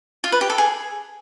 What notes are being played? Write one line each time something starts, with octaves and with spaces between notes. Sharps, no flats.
F4
B4
G4
A4
G#4